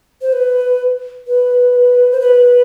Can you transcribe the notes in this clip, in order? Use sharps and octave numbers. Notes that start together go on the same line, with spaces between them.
C5
B4
B4
C5
B4